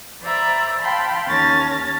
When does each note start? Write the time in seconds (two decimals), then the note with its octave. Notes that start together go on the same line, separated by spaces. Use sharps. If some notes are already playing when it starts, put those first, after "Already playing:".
0.22 C5 D5 E5 A#5 B5
0.82 F5 G5 A5 B5 C6
1.27 D#2 C#4 A5 F6 A6 A#6